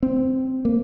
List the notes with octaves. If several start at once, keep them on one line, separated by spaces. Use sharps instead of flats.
C4
A#3